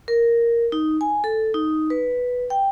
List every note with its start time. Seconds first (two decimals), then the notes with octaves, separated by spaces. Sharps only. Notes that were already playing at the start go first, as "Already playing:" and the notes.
0.08 A#4
0.72 D#4
1.01 G#5
1.24 A4
1.54 D#4
1.90 B4
2.50 G5